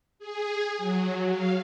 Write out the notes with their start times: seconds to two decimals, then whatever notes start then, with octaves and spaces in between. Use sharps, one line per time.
0.19 G#4
0.78 F#3
1.31 F5